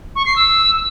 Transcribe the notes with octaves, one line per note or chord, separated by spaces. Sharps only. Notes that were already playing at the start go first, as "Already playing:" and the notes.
C#6
C7
E6